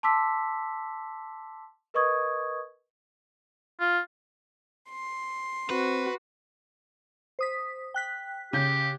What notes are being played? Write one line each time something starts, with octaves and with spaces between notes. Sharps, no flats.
A5 C6 D6 E6 B6
A#4 B4 D#5 C#6 D#6 G#6
F4
C6
C4 F#4 B4
C5 D#6 B6
G5 F#6 B6
C#3 G4 G6